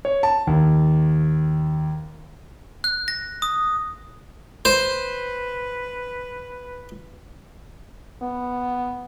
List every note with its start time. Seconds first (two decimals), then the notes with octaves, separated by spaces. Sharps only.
0.05 C#5
0.23 A5
0.47 D#2
2.84 F#6
3.08 A#6
3.42 D#6
4.65 B4 C5
8.22 B3